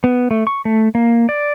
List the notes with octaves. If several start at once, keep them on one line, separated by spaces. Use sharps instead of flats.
B3
A3
C#6
A3
A#3
D5